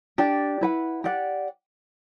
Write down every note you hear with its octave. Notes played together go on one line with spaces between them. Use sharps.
D4 G4 D5 G5
E4 B4 F#5
G4 D5 F#5